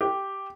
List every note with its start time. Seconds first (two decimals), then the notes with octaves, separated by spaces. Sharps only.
0.01 G4